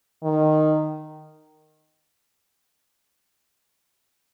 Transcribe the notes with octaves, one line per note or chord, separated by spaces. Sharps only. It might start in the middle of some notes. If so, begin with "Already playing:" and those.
D#3